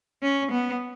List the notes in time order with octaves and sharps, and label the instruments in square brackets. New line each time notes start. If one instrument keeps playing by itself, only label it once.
[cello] C#4
B3